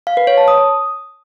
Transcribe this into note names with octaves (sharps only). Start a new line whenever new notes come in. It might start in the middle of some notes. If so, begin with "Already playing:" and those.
F5
B4
C#5
A5
D#6